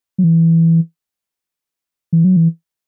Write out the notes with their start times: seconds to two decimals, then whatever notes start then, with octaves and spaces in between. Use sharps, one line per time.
0.18 F#3
0.24 E3
2.13 E3
2.24 F#3
2.37 E3